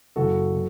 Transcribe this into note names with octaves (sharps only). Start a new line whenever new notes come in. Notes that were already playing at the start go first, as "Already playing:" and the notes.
F#1 F#2 C#3 F#3 F#4 A4
B2 F#3